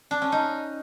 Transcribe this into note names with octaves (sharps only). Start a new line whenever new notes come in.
D4
C#4
D#4